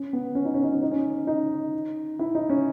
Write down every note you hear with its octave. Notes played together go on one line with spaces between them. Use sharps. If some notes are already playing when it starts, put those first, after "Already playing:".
Already playing: C#4
B3
C#4
D#4
C#4
D#4
C#4
D#4
C#4
D#4
E4
D#4
C#4